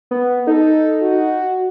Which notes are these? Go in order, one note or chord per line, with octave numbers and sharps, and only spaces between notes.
B3
D#4 A4
F#4